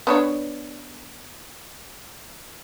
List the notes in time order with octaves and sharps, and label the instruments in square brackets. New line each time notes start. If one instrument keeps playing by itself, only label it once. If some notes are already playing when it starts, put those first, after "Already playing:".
[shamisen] B3 D4 C#5